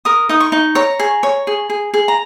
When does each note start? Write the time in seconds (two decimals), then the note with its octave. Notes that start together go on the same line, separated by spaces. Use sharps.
0.05 A#4 D#6
0.29 D#4 D#6
0.40 C#6
0.52 D#4
0.75 C#5 A#5
0.99 G#4
1.23 C#5
1.47 G#4
1.70 G#4
1.94 G#4
2.08 A#5